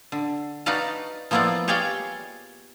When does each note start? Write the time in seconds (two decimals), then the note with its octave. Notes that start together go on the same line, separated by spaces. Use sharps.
0.12 D3
0.66 D#4 F#4 B4 D5 F5 A5
1.31 F3 A#3 B3 E4 F4 D5
1.68 G4 G#4 C#5 D5 F5 G5